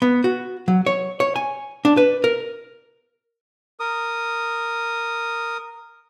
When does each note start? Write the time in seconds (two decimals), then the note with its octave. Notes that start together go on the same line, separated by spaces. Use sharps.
0.02 B3
0.24 F#4
0.68 F#3
0.86 C#5
1.20 C#5
1.36 G#5
1.85 D4
1.97 B4
2.24 A#4
3.80 A#4 D#6